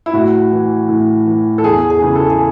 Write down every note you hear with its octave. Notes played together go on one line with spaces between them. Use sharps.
E4
A2 F#4
E3
A2
E3
A4
E2 G#4
G#4
C#3 E3
A4
G#4